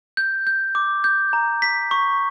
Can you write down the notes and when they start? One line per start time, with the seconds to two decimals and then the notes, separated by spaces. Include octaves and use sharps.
0.17 G6
0.47 G6
0.75 D6
1.04 G6
1.33 A#5
1.62 B6
1.91 C#6